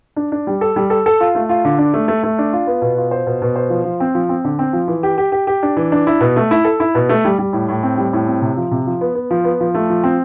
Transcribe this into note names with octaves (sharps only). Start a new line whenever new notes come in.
D4
D4
G3
A4
G3
A4
A4
F4
A3
F4
D3
D4
A3
A3
A3
D4
F4
B3
B2
F4
C5
B2
B2
C5
F3
F3
C4
F3
C4
D3
C4
F3
E3
G4
G4
G4
G4
D4
E3
D4
E4
B2
A3
E4
A4
E4
B2
A3
G3
G3
A2
A2
C4
G3
A2
C4
C3
F3
C3
F3
B3
B3
F3
B3
F3
A3
F3
C4